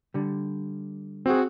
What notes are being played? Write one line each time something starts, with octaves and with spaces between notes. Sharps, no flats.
D3 G3
C4 F#4 G#4